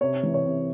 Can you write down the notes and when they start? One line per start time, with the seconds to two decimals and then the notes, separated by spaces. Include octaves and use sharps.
0.01 C3 C#5
0.23 E3
0.34 C#5
0.45 C3